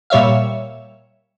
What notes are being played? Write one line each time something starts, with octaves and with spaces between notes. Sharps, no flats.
A#2 G3 C#5 E5 F5